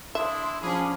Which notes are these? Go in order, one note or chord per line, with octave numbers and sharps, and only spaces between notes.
D4 E4 E5 C6 D#6
F3 C#4 D4 G#4 B5 D6